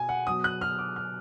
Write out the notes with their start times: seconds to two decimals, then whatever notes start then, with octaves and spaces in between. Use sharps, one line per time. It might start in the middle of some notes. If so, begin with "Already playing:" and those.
Already playing: B2 G#5
0.09 F#5
0.27 B2 F#3 D#6
0.44 F#6
0.61 F6
0.79 D6
0.96 F6